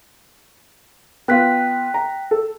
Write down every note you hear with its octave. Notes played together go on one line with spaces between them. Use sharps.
B3 F4 G5 F#6 B6
A#5
A4